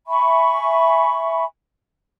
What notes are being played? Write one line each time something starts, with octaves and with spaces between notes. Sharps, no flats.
E5 G#5 B5 C#6